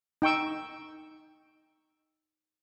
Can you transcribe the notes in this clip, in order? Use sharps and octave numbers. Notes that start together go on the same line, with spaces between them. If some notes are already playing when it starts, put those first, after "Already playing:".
D#4 G5 C#6 E6